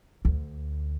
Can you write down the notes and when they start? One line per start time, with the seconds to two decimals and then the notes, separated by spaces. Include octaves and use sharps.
0.25 D2